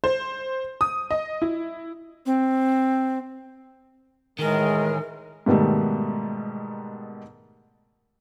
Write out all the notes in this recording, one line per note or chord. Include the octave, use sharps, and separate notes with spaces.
C5
D#6
D#5
E4
C4
A2 D#3 E3 G#3 G#4 A#4
G#2 B2 D#3 G3 A3